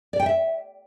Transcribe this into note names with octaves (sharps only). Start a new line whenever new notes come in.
D5
G5
E5